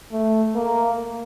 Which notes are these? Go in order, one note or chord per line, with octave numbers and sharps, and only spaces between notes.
A3
A#3